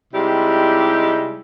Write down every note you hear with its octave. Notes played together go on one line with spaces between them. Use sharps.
C3 G3 G#3 D#4 E4 G4